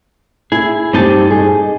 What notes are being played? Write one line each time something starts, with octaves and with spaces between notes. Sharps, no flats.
E4 G#4
G2 C4 D#4 G4 A5
G#4 D#5